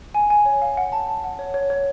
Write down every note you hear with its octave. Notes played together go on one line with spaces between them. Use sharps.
G#5
G#5
C#5
F5
F#5
A5
A5
F#5
C#5
C#5
C#5